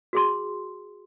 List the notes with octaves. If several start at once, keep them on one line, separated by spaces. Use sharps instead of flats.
F#4 G#4 C6